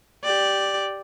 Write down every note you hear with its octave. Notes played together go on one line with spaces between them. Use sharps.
G4 D5